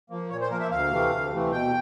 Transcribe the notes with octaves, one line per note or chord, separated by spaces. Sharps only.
F3 A#3
A#2 C#5
C5
F3 A#3 A#4
E5
D2 F5
C3 E3 A3
D2
C3 E3 A3
B2 G5